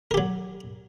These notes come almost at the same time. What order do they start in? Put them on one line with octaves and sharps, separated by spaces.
A#4 G4 F#3